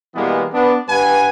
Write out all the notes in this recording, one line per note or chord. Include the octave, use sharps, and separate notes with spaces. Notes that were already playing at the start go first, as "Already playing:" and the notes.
B2 E3 G3 G#3 A#3 B3
B3 D4
G2 B4 F#5 G#5